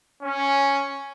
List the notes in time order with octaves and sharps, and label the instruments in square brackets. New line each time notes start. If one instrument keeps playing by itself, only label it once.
[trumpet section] C#4